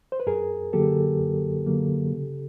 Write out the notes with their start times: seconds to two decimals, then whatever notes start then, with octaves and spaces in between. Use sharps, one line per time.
0.12 C5
0.20 B4
0.27 F#2 G#4 A#4
0.73 D3 F#3 A#3 G4 A4
1.20 F#2
1.66 D3 F#3 A#3
2.12 C#3